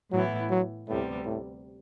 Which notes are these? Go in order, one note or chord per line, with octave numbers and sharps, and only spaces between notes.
A2 E3 F#3 B3 E4
F#3
D2 A2 C3 G3 B3
A2